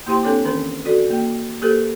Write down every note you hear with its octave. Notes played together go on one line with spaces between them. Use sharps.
A#3 E4 G4 C5 G5 C6
C4 D4 A4 C#5 G5 D6
D#3 E3 C#4 A#4
F#4 A4 D5
A#3 G5
A#3 G4 A4 A#4 C5